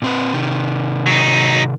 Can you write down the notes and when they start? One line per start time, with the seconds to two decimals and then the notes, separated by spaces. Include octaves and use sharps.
0.02 A#2 C4 B4
0.34 C3 D#3
1.06 F#3 D#4